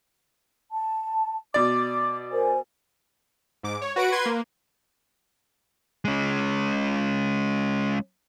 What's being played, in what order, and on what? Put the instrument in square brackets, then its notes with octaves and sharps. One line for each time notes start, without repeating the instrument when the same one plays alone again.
[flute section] A5
[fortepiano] B2 D5 [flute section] D6
[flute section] A#4 C5 G#5
[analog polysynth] G#2 D6
C#5
F#4 B4 F#5 D7
B4 C6 G#6
A#3
[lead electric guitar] G#3 C#4